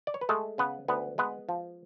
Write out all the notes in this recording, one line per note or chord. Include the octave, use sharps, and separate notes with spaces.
D5
C#5
B4
G#3 A3 A4
C#3 B3 B4
D2 B3 B4
G#3 B3 B4
F3